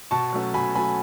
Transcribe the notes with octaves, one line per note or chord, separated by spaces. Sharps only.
B2 A5 C#6
F#3 A3 C#4
B2 G#5 B5
F#3 A3 C#4 G#5 B5